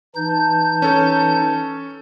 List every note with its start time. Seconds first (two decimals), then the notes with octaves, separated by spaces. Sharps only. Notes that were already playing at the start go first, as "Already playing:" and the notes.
0.16 E3 D#4 A5 G6
0.82 C#4 A4